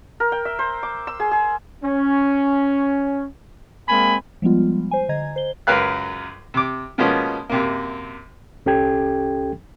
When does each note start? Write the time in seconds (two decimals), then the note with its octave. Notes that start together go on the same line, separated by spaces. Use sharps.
0.20 A#4
0.32 G5
0.45 E5
0.59 C5
0.83 D6
1.07 E6
1.20 G#4
1.31 G#4
1.83 C#4
3.88 G#3 A#3 C4 G#5 B5
4.42 F3 G3 G#3 B3 F4
4.91 C5 G#5
5.09 D3 D#5 A#5 G#6
5.36 C5 G7
5.67 C#2 F#2 A#4 B4 F5 F#6
6.54 C3 D6
6.98 B2 F3 G#3 A#3 B3 C#4
7.49 F#2 C3 A#3
8.66 C2 C#4 G4 A4 G5 G#6